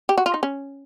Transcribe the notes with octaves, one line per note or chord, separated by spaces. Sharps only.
G4
F#4
F4
D#4
C#4